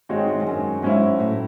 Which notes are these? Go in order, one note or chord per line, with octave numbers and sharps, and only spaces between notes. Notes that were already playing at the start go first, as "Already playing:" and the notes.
G#2 D#3 G#3 C4 F#4 C#5
E2
G#2
F#2
G#2 F#3 C#4 E4
A2